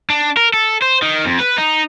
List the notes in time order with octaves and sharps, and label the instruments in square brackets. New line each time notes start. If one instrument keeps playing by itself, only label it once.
[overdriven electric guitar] D4
A#4
A4
C5
D#3
F2
B4
D#4